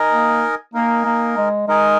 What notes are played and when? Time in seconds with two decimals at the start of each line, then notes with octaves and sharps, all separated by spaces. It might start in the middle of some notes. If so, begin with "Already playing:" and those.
Already playing: D#4 A#4 D#5 G#5
0.11 A#3
0.74 A#3 D#4 A#4 D#5 G#5
1.05 A#3
1.37 G#3
1.67 G#3 D#4 A#4 D#5 G#5